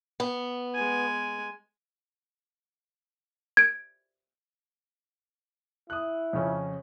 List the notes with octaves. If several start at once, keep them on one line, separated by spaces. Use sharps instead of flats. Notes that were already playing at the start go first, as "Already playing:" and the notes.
B3
G#3 G#5
G#6 D7
E4 D#6 F#6
F2 C#3 C#4